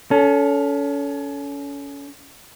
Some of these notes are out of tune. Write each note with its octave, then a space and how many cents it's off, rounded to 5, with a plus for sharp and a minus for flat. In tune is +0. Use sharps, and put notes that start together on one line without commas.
C#4 +30 A4 +0